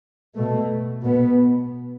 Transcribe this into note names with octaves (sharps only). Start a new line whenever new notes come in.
B2 A3
B2 B3